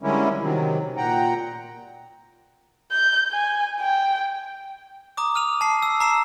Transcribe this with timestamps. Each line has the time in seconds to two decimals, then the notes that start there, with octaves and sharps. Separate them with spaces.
0.03 D3 G3 G#3 A#3 C#4 E4
0.41 C3 D#3 F#3
0.97 A#2 F#5 G5 A#5
2.92 G6
3.32 G#5
3.81 G5
5.17 A#5 D6 D#6
5.35 F6 D#7 F7
5.61 A5 C7
5.82 E6
6.00 A#5 C7 E7